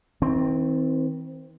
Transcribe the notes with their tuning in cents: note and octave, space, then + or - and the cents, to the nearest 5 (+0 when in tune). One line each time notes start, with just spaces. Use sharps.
D#3 +45 C4 +0